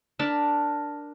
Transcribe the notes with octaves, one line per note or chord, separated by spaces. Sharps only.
D4 A#4 A5 B5